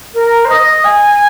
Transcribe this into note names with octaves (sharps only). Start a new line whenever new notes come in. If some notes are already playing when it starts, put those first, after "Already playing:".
A#4
C5
D#5
G#5